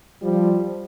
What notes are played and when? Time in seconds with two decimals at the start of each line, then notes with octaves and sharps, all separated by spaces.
0.21 F3 G3